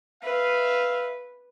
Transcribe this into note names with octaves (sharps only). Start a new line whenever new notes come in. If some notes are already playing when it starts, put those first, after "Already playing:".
B4 E5 F5